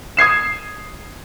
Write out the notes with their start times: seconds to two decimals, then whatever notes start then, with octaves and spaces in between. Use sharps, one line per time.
0.17 D#6 G#6 C7 E7